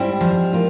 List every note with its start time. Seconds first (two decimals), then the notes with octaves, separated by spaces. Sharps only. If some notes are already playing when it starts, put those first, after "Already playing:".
Already playing: G#2 G3 C4 E4 G4
0.21 F3
0.53 A#3 F4